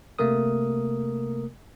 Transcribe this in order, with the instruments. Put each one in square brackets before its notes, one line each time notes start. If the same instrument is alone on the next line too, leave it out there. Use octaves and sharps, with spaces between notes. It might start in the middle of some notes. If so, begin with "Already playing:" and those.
[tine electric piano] C3 A3 A#3 A#4 D#6